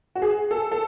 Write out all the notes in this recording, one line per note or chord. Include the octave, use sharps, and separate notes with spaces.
F#4
G#4
A4
A4